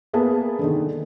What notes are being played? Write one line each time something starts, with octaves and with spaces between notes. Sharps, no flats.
A#3 B3 G#4 B4 A5
D3 D#3